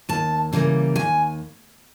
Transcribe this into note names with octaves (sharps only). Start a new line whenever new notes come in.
D#2 A5
C#3 E3 G3 A#3
D#2 G#5